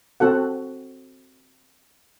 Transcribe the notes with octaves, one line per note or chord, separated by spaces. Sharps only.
C4 F#4 A4 F#5